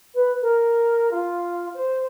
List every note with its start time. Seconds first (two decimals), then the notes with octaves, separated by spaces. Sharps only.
0.14 B4
0.42 A#4
1.11 F4
1.74 C5